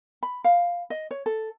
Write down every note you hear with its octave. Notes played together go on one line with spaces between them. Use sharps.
B5
F5
D#5
C#5
A4